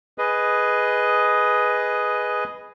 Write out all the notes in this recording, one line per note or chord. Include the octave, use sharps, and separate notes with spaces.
G#4 B4 D#5